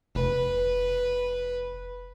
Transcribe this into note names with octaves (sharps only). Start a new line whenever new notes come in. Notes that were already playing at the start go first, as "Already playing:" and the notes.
F1 B4